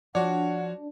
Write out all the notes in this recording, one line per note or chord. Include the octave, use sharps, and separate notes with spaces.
F3 D4 F#4 C#5 F#5